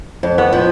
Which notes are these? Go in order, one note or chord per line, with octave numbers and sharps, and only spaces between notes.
F2
B3
F3